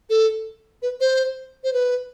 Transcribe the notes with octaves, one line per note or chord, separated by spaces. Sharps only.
A4
B4
C5
C5
B4